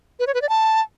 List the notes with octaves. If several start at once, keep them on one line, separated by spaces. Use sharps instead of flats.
B4
C#5
B4
D5
A5